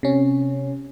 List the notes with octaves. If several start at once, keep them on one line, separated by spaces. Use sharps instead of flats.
C3 C#4